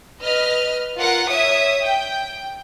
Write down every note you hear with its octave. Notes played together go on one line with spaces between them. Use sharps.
B4 D#5 F6
F4 A#4 F#5
C#5 E5 D#6
G5